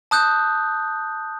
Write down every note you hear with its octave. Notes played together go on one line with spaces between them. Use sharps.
A5 D#6 F#6 G6